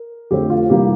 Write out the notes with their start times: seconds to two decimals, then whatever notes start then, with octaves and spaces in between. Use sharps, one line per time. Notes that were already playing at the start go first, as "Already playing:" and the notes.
Already playing: A#4
0.31 F2 D3 A3 C4 G4
0.50 F4
0.70 C3 E3 G3 A#3 G4